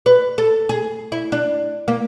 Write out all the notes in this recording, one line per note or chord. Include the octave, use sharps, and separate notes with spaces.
B4
A4
G#4
E4
D4
A#3